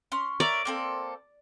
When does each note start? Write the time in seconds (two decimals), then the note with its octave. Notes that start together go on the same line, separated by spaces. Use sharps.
0.12 C#4 C6
0.40 A#4 C#5 D5 E5
0.65 A#3 C4 A4